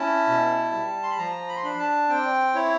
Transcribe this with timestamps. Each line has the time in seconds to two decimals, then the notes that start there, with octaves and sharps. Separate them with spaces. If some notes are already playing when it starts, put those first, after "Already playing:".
Already playing: C#4 E4 A5
0.27 B2
0.72 G3
1.03 C6
1.11 B5
1.18 F3 A#5
1.48 B5
1.56 C6
1.64 D4 B5
1.79 A5
2.09 C4 G5
2.55 E4 C#5